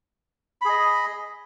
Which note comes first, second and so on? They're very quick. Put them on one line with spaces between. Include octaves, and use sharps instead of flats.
B5 G#4 D#5